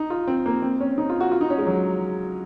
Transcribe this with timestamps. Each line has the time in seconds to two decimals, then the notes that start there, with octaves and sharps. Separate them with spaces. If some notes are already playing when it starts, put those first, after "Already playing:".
Already playing: D#4
0.10 F4
0.28 C4
0.46 A#3
0.62 C4
0.80 C#4
0.98 D#4
1.10 F4
1.21 F#4
1.32 F4
1.41 D#4
1.50 C#4
1.58 G#3
1.67 F#3